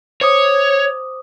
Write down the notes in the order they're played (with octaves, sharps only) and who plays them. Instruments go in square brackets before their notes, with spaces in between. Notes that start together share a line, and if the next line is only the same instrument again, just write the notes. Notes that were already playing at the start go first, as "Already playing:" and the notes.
[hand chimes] C5 D6 D#6 [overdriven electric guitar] C#5